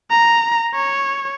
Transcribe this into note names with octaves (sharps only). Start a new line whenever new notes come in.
A#5
C#5